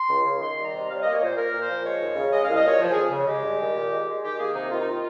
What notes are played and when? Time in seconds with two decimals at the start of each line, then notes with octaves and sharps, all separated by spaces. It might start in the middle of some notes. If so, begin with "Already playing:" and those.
Already playing: C6
0.09 C#2
0.25 C#3
0.41 D#3 C6
0.57 G3
0.65 A#5
0.73 C3 D#5
0.89 G3 F5
0.95 C#5
1.01 A#3 D#5
1.12 C#5
1.21 A#2 C5
1.36 A#3 A#4
1.53 A#2
1.60 C5
1.69 F3
1.84 G#3 C#5
2.00 D#2
2.16 C#3
2.32 G#3 D#5
2.44 C2 F5
2.55 D#5
2.64 A#2 C#5
2.80 F3
2.92 F2 G#4
3.11 C#3
3.27 G#3 G4
3.43 G2
3.59 D#3
3.74 A#2
3.91 G#3
4.07 G#3
4.23 D#3 G4
4.39 A#3 G#4
4.54 C3 D#4
4.70 D#3 F4
4.79 D#4
4.89 F4